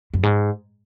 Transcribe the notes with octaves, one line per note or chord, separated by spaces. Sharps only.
F#2
G#2